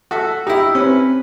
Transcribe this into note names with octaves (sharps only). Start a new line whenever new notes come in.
F#4 A4 E5
D#4 E4 G4
C4 C#4 B4